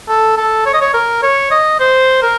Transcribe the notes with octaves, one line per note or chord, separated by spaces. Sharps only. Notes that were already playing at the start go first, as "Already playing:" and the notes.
A4
A4
C#5
D#5
C#5
A#4
C#5
D#5
C5
A#4